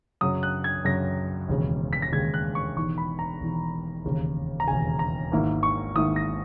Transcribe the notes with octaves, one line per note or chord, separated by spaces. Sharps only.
F#2 C#3 F#3 D#6
F#6
G#6
F#2 C#3 F#3 A#6
E1 D#2 C#3 G#3
B6
A#6
E1 D#2 C#3 G#3 G#6
F#6
C#6
E1 E2 D#3 C#6
B5
A#5
E1 E2 D#3
E1 D#2 C#3
A#5
E1 D#2 C#3 G#5
A#5
G#1 G#2 D#3 A#3 E4
C#6
G#1 G#2 D#3 A#3 E4 D#6
A#6